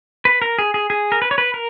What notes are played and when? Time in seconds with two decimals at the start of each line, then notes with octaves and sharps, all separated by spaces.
0.25 B4
0.42 A#4
0.59 G#4
0.74 G#4
0.90 G#4
1.12 A#4
1.22 B4
1.31 C#5
1.38 B4
1.54 A#4